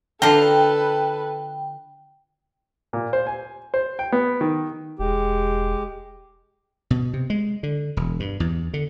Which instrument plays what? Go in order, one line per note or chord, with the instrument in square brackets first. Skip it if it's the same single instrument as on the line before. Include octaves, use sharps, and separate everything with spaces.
[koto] D3 F4 A#5 [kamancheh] A4 B4 [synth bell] G5 [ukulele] A5
[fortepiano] A#2
C5
G#5
C5
G5
B3
D#3
[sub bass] E1 [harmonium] G#3 G4
[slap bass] B2
C3
G#3
D3
E1
G2
E2
D3